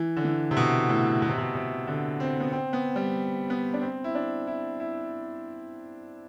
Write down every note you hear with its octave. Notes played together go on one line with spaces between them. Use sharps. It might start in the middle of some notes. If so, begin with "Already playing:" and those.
Already playing: E3
D3
E3
C3
B2
A2
B2
C3
B2
C3
D3
C4
B3
C4
B3
G3
B3
D4
C4
E4
D4
E4
E4